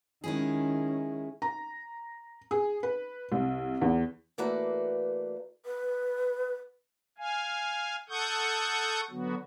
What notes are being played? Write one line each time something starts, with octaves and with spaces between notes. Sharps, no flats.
D#3 G#3 C#4 E4 G#4
A#5
G#4
B4
C2
E2
E3 A3 A#3 F#4 B4 D5
B4
F5 G#5
A4 F#5 C#6 D#6 G6
D3 F#3 B3 F#4